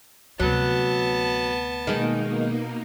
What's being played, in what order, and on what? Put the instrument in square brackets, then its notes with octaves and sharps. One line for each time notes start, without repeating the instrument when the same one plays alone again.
[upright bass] D2 C3 [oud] F#3 [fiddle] B3 A5
[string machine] B2 A#3 D#4 [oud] D#3 G#3